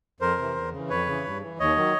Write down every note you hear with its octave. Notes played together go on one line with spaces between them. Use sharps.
F2 A#4 C5
C3 E3
E2
C#3 E3
F2 B4 C#5
C#3 E3
G2
E3
D#2 C#5 D#5
D#3 F#3